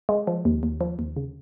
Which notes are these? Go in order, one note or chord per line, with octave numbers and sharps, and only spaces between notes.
G#3
F3
D#2
D#2
F3
D#2
C#3